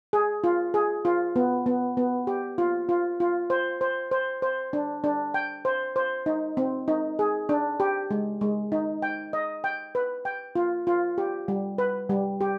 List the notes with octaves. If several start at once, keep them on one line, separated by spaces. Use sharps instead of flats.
G#4
F4
G#4
F4
B3
B3
B3
G4
F4
F4
F4
C5
C5
C5
C5
D4
D4
G5
C5
C5
D#4
C4
D#4
G#4
D4
G4
G#3
G#3
D#4
G5
D#5
G5
B4
G5
F4
F4
G4
G3
B4
G3
G4